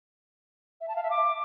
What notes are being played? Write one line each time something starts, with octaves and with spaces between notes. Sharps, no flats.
E5
A5
F5
E5
D6